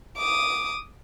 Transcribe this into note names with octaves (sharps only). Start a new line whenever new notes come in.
D6 D#6